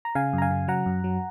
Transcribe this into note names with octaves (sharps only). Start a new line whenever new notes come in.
A#5
C#3 F5 G#5
F#2
A#5
F5 G#5
C#3
F#3 F#5 A#5
F#2
F#3